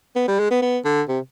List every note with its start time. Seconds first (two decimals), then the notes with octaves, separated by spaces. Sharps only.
0.16 B3
0.28 G3
0.39 G#3
0.51 B3
0.62 B3
0.85 D3
1.09 C3